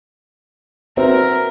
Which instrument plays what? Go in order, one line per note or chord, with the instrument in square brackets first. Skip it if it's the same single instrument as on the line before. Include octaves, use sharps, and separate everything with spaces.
[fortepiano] C4 [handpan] F#4 B4 E5 [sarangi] A#4